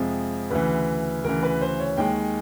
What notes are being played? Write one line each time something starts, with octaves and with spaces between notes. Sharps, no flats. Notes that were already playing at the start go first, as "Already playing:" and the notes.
Already playing: F2 C3 F3 G#3
D2 C#3 E3 B4
D2 C#3 E3 A#4
B4
C5
C#5
D#2 D#3 G#3 G5